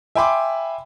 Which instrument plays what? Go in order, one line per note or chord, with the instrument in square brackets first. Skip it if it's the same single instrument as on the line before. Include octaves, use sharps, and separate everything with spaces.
[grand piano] E5 G5 G#5 B5 C6 D6